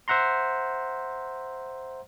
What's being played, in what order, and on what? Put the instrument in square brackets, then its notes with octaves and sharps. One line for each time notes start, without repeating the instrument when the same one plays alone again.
[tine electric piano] C5 E5 F#5 A#5 C6